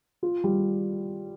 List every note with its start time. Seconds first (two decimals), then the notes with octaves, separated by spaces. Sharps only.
0.23 F4
0.44 G3